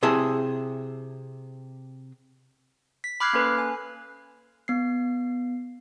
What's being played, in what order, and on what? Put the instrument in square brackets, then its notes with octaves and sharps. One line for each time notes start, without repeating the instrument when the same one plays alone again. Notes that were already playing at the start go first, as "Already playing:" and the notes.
[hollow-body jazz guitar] C3 E4 G#4 E5 A5
[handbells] B6
B5 D6 F6 F#6 G#6 C7
A#3 C#4 A4 B4
G#5
[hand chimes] B3 C7